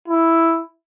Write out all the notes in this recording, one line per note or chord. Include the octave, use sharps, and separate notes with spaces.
E4